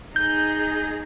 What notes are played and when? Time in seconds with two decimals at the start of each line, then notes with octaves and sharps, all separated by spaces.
0.16 D#4 G#4 G6